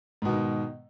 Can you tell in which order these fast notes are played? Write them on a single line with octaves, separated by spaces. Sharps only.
G#2 B2 D#3